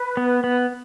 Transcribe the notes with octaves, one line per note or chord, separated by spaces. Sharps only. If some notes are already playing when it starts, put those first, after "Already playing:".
Already playing: B4
B3
B3